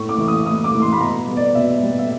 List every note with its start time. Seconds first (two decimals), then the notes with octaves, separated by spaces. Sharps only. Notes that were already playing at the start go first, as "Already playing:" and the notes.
Already playing: A2 C#6
0.09 D6
0.18 E3 A3
0.28 D#6
0.46 A2 D#6
0.64 D6
0.73 E3 A3
0.82 C6
0.93 B5
1.00 B2 A#5
1.27 G3 B3
1.37 D5
1.55 B2 E5
1.82 G3 B3
1.99 E5